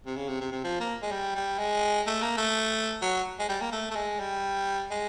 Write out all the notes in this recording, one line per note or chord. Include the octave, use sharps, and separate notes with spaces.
C3
C#3
C3
C3
C3
F3
A#3
G#3
G3
G3
G#3
A3
A#3
A3
F#3
G#3
G3
A#3
A3
A3
G#3
G3
G#3